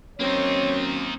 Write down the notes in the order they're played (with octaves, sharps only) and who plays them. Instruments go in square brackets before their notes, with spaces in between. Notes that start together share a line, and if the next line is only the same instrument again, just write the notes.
[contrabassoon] F#2 [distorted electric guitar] A#3 D#4 [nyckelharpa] C4 [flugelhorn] C#5